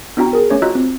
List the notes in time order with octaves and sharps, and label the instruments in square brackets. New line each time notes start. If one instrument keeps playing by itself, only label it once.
[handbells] B3 D4 E4 F#4 G5 A#5
G#4 A#4
A3 C#4 C#5
F4 F#4 D#5 A#5 E6 F#6
C4